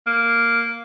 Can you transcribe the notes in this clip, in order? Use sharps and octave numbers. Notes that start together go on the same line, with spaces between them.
A#3